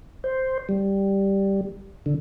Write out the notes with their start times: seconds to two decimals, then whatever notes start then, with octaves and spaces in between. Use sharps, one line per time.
0.24 C5
0.69 G3
2.06 D3